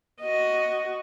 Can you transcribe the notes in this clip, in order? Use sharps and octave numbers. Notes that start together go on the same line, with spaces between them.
F#4 D#5